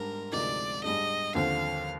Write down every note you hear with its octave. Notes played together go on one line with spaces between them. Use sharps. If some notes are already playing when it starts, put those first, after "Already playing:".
Already playing: G#2 G3 D4 A#4
D2 C3 F3 G#3 D#4 D5
G#2 G3 D4 G#4 D#5
D#2 D3 F3 C4 F5